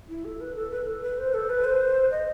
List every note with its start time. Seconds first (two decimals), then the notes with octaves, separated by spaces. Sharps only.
0.09 E4
0.25 A4
0.41 B4
0.56 A4
0.72 B4
0.87 A4
1.03 B4
1.18 C5
1.34 A4
1.49 B4
1.64 C5
2.11 D#5